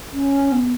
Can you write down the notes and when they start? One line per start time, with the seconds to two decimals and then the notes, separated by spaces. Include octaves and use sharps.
0.13 C#4
0.52 B3